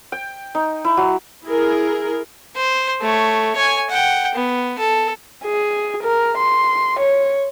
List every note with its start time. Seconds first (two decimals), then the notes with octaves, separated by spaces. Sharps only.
0.12 G5
0.55 D#4
0.85 E4
0.97 F#3
1.45 E4 G#4 A#4
2.56 C5
3.01 A3 C#5
3.56 C#5 G#5
3.90 F#5 G5
4.35 B3
4.79 A4
5.44 G#4
6.03 A#4
6.38 C6
6.99 C#5